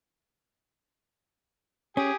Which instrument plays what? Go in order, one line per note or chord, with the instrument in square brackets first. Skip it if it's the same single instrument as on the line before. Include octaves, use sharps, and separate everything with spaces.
[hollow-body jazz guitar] C#4 [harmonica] G4 G#5 D#6